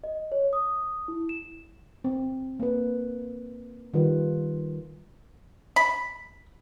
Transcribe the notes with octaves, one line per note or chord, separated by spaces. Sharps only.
D#5
C#5
D#6
E4
E7
C4
A#3 B4
D#3 G3 F4 B4
B5